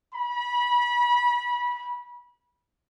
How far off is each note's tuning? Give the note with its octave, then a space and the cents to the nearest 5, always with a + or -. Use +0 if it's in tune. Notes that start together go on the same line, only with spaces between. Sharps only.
B5 -25